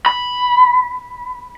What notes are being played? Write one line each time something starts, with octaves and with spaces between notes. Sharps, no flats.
B5